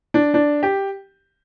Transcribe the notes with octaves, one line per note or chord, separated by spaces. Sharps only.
D4
D4
G4